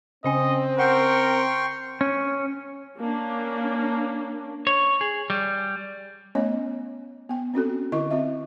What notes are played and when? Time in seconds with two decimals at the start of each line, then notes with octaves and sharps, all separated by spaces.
0.24 C#3 C4 C#4 D#5 G#5
0.79 A#4 F#5 G5 C6 C#6 G6
2.01 C#4
2.97 A#3 C#4 D4
4.67 C#5
5.01 G#4
5.30 G3
6.35 A3 B3 C#4 C#5 D#5
7.29 B3 G5
7.54 C4 C#4 F#4 A4
7.92 D3 E4 A#4 D#5 C#6
8.11 C4 F4 D#5 E5